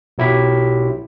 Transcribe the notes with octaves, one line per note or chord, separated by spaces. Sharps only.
B1 F#3 E4 G4 B6